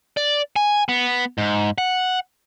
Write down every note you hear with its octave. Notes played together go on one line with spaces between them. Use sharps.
D5
G#5
B3
G#2
F#5